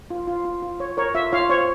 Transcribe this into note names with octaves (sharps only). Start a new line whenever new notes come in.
F4
F4
F4
F4
C#5
A#4 C#5
F4 E5
F4 C#5 F5
C5 C#5